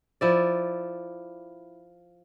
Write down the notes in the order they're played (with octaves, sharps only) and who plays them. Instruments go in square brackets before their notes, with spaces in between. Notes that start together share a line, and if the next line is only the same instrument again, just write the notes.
[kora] F3 E4 D5